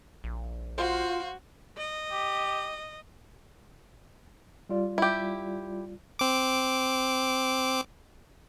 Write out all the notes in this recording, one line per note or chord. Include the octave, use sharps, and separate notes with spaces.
A#1
F4 F#4 C5 F5 C6
D#5
G4
G3 F4 D5
E4 G4
C4 D6